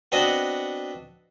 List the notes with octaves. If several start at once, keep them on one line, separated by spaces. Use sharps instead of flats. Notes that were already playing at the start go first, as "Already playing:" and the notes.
B3 C4 D4 F#4 D#5 F#5